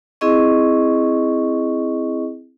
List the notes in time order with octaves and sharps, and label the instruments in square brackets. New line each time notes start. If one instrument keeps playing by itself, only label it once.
[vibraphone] C4 E4 G#4 D#5 C#6